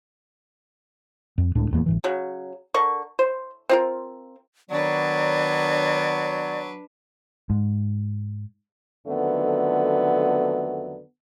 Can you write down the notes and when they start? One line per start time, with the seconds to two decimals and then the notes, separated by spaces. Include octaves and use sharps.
1.38 F2
1.55 C#2 A2 D4
1.71 D1 E2 A#3
1.86 G1 G#2 E3
2.04 C#3 F#3
2.74 D3 A#4 C#6
3.19 C5
3.69 C4 F4 A#4
4.70 D#3 F#3 B3 D4 B4 C#5 D5
7.50 G#2
9.07 F2 D3 D#3 F#3 A3 B3